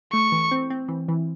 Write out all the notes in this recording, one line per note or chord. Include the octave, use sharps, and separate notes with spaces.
A3 C#6
E3
C4
C4
E3
E3